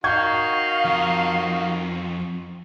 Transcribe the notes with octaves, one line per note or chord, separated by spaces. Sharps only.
D#3 D#4 F#4 F5 C#6 G6 G#6
F2